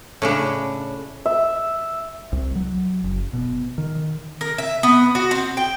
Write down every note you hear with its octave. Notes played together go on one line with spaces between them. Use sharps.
A2 C#3 D4
E5
C2
F#3
F#1
B2
D#3
A#4
E5
B3
F#4
C4
G5